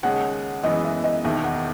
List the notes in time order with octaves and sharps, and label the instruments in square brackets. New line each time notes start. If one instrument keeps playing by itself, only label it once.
[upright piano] D#2 C#3 G#3 C#4 G#4 [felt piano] F#5
[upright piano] F#2 E3 G#3 B3 [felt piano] D#5
[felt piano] E5
D#5
[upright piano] E1 D#2 D#3 [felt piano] E5
[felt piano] F#5